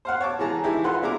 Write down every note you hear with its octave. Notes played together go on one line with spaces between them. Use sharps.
C5 F5 F#5
C#5 A5 D6
E3 G#3 G#4 A5 A#5
E3 G#3 D#4 E4 G4
F4 A4 B4 F#5 C6
G#3 D4 E4 G#4 A#5 D6